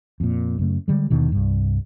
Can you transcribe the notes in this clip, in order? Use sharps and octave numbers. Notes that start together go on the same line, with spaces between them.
F2 A#2
F#2 C#3 A3
D3 G3 G#3
D#2 B2 D3 D#3
C2 G2